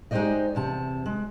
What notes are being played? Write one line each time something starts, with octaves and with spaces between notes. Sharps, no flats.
G#3 D#4 G4 C5 D5 D#5
E2 C3 A5
G#3